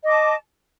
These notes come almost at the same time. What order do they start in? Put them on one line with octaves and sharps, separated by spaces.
D#5 D6 A5